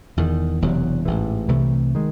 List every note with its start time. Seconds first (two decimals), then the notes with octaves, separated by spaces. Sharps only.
0.17 E1 E2 D#3
0.61 E1 E2 C3 F#3
1.05 A1 G#2 E3
1.48 C2 C3 E3 A3
1.95 D#3 G#3